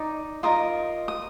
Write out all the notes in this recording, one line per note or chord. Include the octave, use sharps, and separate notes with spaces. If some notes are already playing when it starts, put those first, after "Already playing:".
Already playing: D#4 D5
F4 A#4 D#5 D#6
D#6